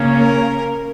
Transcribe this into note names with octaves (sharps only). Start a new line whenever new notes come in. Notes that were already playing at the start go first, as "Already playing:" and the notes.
Already playing: C#3 A#3 C#4
A#4